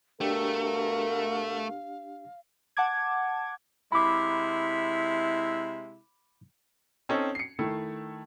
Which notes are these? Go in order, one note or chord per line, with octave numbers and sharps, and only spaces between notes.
B2 A3 D4 G4 A#4 F5
F#5 A5 D6 G#6
C3 G#3 E4 B5 D6
C4 C#4 D#4 A4
C7 C#7
D#3 A3 E4